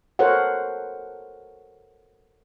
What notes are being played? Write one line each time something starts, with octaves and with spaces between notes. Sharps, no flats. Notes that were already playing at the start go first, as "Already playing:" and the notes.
F#4 A4 A#4 C5 C#5 F#5